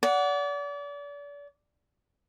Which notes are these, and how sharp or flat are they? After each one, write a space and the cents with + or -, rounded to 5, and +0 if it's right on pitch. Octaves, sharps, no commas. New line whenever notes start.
D5 -35 F#5 +0